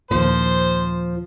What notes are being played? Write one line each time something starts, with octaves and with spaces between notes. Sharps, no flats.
D#2 A#2 F3 C5